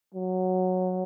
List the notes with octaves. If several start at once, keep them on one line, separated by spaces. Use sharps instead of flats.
F#3